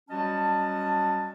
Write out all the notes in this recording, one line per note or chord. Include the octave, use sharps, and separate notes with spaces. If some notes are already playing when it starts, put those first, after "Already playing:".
F#3 G3 C#4 F#4 D#5 A5